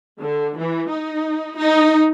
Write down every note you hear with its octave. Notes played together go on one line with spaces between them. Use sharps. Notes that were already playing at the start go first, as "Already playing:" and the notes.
D3
E3
D#4
D#4